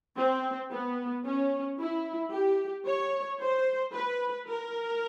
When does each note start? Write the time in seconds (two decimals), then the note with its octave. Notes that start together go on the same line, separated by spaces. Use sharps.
0.17 C4
0.71 B3
1.25 C#4
1.79 E4
2.32 G4
2.87 C#5
3.40 C5
3.94 B4
4.48 A#4